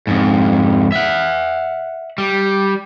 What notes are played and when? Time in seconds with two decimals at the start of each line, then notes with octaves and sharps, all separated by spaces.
0.07 F2 G#2
0.92 E5 F#5
2.18 G3